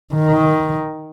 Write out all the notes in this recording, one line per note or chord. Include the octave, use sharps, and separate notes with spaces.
D#3